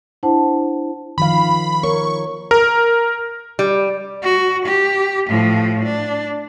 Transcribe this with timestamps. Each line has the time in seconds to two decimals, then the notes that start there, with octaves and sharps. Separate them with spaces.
0.23 D4 E4 C5 F#5 A5
1.18 D#3 F3 F5 B5
1.83 A#4 C#5 C#6
2.51 A#4
3.59 G3
4.22 F#4
4.65 G4
5.28 A2 F3
5.84 D4